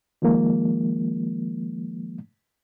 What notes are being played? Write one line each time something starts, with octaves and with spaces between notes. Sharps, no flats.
D#3 F3 G#3 A#3